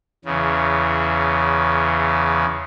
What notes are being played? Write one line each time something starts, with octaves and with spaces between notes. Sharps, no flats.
E2 C#3